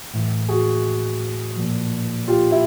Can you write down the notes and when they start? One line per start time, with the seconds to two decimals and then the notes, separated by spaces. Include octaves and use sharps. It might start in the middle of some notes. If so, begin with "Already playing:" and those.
0.13 A2 E3
0.49 F#4 G#4
1.56 A#2 F3
2.28 F4 G4
2.51 E4